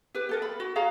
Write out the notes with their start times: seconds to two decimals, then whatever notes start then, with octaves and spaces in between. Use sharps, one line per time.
0.15 G4 B4
0.29 G4 A4 A#4
0.42 B5
0.60 F#4
0.75 F#4 G#4 F5 A#5